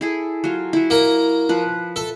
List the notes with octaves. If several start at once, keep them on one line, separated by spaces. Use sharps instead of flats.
E4 G#4 A4
F#3 F4
F#3 E4
A#3 A#5
F3 B4
A4 E5